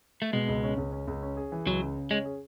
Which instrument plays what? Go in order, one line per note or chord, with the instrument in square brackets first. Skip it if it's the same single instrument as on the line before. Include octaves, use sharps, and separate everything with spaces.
[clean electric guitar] A3
[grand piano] B2 [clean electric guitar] G#3
[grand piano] C#2
C#4
C#2
C#4
C#2
C#4
G#4
E3
[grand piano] C#2 [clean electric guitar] F#3
[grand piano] C#3
C#3
[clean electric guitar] G#3 [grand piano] C#4
[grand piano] G#4